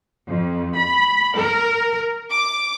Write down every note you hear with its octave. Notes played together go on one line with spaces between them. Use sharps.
F2
B5
A#4
D6